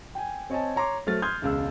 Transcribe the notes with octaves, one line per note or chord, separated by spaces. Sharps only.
G5 G#5
C4 C#5 D#5 G#5 A5
C#5 A#5 C6 D6
F#3 A3 C5 F6 A6
C6 D#6 F6 G6 G#6
E1 C#2 F5 E6